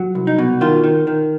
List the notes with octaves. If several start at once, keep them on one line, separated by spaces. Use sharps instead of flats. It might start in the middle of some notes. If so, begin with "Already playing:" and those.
Already playing: F#3
C2
D#4
B2
D#3 F4
D#3
D#3